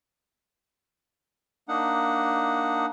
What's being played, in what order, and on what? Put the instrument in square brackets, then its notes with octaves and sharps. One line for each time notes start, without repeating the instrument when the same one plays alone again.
[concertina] A#3 D4 D#4 F#5